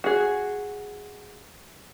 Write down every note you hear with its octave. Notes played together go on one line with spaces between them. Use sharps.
F#4 G#4